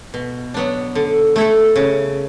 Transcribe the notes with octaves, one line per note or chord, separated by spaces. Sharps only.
B2
F#3 B3 D4
D3
A3 E4 A4
C#3